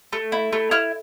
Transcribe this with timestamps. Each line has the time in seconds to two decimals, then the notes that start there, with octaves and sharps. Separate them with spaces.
0.13 A3
0.32 E4
0.53 A3
0.71 E4 F6